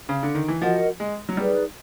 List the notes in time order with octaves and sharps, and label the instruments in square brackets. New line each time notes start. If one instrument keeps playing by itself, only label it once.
[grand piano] C#3
D3
D#3
E3
[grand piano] F3 [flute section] F#4 A#4 D#5 F#5
[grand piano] G#3
F#3
[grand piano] G3 [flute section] D#4 G#4 B4 D5